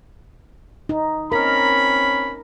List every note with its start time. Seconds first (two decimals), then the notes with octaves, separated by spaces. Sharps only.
0.89 D#4
1.32 C4 C#4 A#4 B5